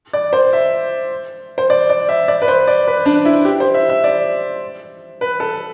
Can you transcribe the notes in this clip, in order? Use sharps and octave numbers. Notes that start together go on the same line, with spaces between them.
D5
C5
E5
C5
D5
D5
E5
D5
B4
C5
D5
B4
D4
E4
G4
C5
E5
E5
D5
B4
A4